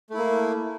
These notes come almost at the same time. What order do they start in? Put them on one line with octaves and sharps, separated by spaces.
A3 E4 A#3